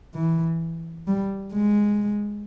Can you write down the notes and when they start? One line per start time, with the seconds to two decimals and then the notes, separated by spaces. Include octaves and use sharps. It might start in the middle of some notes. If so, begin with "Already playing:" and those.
0.15 E3
1.07 G3
1.54 G#3